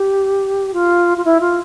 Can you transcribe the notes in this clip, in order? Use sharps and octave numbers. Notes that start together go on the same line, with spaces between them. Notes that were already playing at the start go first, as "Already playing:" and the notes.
Already playing: G4
F4
F4
E4
F4